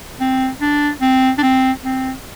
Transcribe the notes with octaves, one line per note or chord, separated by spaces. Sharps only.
C4
D4
C4
D4
C4
C4